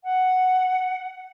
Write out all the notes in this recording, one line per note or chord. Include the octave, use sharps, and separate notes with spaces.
F#5